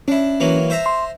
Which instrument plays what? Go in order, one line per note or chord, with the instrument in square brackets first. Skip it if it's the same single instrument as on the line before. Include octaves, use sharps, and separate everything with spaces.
[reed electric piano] C#4 [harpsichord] D4 E4
[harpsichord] E3 F#3 A#3
C5 E5 A#5
[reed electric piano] C6